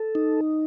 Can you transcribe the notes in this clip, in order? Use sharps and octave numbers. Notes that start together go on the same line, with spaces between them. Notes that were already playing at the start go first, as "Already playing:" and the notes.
Already playing: A4
D#4